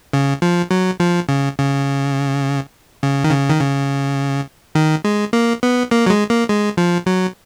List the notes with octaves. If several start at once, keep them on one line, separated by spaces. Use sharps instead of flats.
C#3
F3
F#3
F3
C#3
C#3
C#3
D#3
C#3
D#3
C#3
D#3
G#3
A#3
B3
A#3
F#3
G#3
A#3
G#3
F3
F#3